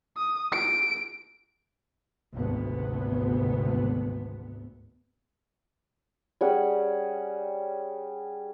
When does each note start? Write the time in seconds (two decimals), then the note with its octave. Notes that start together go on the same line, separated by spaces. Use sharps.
0.17 D#6
0.53 D7
2.34 G#1 D2 C3 B3
6.41 G3 C#4 G#4 F#5